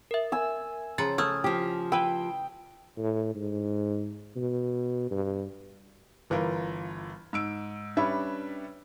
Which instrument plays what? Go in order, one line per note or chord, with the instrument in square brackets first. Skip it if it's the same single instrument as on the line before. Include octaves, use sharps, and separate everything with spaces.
[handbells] A#4 E5
[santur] G#5 E6
[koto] C#3 F3 F#5 [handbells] A#5 A6
[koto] A3 [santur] D#6 [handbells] F6 G#6
[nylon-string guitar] F3 G4
[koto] E4 B4 [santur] G5
[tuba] A2
G#2
B2
G2
[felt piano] G1 E3 F4 A#4
G#2 E6 D7
G3 C#4 D4 B4 C#5 E5